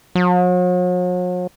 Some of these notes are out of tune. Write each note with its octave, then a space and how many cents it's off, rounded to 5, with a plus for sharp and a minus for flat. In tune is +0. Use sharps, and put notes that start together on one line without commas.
F#3 -45